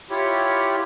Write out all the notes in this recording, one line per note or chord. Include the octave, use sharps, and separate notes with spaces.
E4 F4 G4 C#5